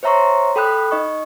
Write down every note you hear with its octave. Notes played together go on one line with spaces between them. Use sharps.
C5 C#5 E5 A#5 C6 C#6
A4 G5 B5 D#6 F#6
D#4 D#5 C#6